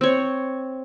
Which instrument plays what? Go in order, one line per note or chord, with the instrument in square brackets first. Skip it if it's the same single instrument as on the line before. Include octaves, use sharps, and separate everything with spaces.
[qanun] C4 C#5